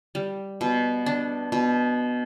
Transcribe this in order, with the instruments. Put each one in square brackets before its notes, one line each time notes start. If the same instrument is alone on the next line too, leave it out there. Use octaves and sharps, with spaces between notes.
[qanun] G3
B2
D4
B2